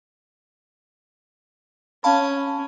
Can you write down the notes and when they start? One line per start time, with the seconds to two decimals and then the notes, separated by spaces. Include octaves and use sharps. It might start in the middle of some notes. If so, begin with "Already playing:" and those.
2.04 C#4 F5 A5 B5